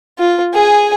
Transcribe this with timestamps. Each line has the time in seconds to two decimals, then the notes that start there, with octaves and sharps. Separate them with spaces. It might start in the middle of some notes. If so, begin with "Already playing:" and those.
0.19 F4
0.54 G#4 G#5